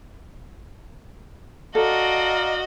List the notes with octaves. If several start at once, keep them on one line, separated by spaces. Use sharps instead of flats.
F#4 A4 D5 D#5 F5 A#5